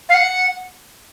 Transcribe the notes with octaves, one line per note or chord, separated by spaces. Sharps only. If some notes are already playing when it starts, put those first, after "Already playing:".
F5
F#5